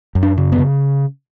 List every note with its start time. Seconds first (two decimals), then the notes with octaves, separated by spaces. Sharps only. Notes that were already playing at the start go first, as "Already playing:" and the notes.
0.15 F#2
0.23 D4
0.37 C#3
0.52 B3
0.59 C#3